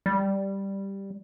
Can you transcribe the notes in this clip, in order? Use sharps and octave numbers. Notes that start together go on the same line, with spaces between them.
G3